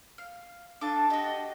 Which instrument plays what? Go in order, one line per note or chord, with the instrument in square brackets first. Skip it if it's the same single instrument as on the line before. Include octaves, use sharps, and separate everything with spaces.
[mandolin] F5
[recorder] D4 [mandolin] F4 A4 D6
[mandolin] F#4 G4 [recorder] D#5